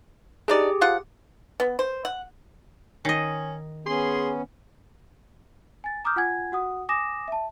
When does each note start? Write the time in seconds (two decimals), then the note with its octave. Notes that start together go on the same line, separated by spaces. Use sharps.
0.48 D4 D#4 G4 G#4 D5
0.81 F3 F4 F#5
1.60 B3
1.79 C5
2.05 F#5
3.05 D#3 C#4 D#5
3.86 B3 C#4 G#4 C6
5.84 G#5 A6
6.05 A#5 D6 D#6 F6 G6
6.16 F4 F#5 G#5 G#6
6.52 F#4 F#5 D#6
6.89 G#5 D6 D#6 A#6 E7
7.28 E5 A5